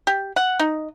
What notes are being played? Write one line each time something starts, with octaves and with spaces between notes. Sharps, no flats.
G4
F#5
D#4